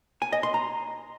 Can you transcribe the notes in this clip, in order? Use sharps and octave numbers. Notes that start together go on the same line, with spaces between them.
G#5
D#5
C6
A#5